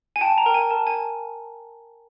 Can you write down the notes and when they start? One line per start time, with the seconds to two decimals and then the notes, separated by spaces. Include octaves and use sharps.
0.16 G#5
0.21 G5 A5
0.38 A#5
0.46 A#4 G5
0.54 G#5
0.71 A#4 A5
0.87 G#5